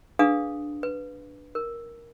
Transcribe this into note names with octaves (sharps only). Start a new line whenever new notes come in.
D4 G#4 B4 F5 D#6
B4
A#4